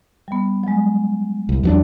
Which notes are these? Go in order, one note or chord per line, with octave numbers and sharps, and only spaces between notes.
G3 B3
F#3 G#3
C2
E2 F#3 D4